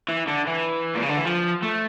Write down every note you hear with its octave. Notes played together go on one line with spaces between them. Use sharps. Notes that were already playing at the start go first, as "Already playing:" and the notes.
E3
D3
E3
A#2
C#3
D3
E3
F3
A3